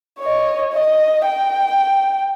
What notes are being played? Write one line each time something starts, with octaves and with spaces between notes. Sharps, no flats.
C#5 D#5
D#5
G5